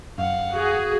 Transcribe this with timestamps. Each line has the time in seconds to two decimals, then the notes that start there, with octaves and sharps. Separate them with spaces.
0.18 F#2 F5 F#5
0.53 F#4 G#4